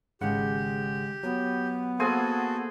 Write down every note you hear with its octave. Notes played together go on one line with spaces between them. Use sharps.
G#1 C#3 G#3 G4 F#5
F#3 B3
A#3 C4 F#4 G#4 A4 G#5